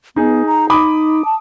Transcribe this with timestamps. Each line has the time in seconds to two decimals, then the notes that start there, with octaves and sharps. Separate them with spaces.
0.16 B3 D#4 G#4
0.46 A#5
0.70 D#4 B5 D6 D#6
1.25 A5